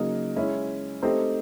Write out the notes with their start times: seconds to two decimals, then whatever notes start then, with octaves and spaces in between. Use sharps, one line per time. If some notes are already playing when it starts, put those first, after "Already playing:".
Already playing: C#3 F#3 A#3 D#4
0.36 G#3 C#4 E4
1.02 A3 C4 D#4 G4 C5